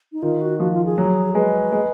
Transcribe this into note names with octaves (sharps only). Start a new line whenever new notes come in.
D#4
D#3 F4
F#4
F3 F#4
F4
G#4
F#3
G#3 B4
G#3